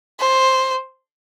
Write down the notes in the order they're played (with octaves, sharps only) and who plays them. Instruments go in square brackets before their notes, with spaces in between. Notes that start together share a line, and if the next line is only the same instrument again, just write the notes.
[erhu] C5